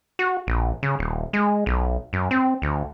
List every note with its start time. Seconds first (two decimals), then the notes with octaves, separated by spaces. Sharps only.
0.19 F#4
0.47 A#1
0.83 C#3
0.99 D#1
1.33 G#3
1.66 B1
2.13 F#2
2.31 C4
2.62 D2